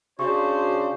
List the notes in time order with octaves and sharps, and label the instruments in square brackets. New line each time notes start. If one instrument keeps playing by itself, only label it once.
[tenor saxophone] C#3 [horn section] D4 C5 [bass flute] F#4 [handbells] C#6